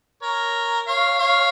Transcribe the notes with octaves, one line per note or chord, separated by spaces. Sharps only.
A#4 C#5
C#5 F5
C#5 F5